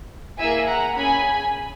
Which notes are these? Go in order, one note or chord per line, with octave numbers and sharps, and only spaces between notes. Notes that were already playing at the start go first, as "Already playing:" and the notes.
A#3 E4 G#4 E5 G#5
F#5 A#5
C#4 G#4 G#5 B5